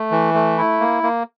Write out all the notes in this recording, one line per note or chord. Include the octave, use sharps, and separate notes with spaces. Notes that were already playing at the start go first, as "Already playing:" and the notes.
Already playing: A3
E3
A3
E4
A#3
A#3